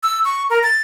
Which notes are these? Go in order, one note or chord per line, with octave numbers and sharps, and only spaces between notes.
E6
C#6
A#4
A6